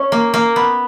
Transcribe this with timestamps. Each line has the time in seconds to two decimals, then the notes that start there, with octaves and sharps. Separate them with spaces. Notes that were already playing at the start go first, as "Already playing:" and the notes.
Already playing: C#4
0.12 A#3
0.34 A#3
0.56 B3